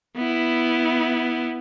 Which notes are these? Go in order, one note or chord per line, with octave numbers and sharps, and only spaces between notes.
B3 E4